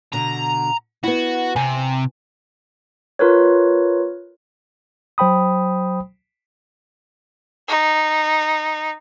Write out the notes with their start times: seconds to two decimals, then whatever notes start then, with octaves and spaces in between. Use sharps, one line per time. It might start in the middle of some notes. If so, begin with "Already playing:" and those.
0.13 B2 D3 A#5
1.04 B3 E4 F#4
1.56 C3 G#5
3.19 F4 A#4 B4 C#5
5.18 F#3 C5 G5 B5 D#6
7.68 D#4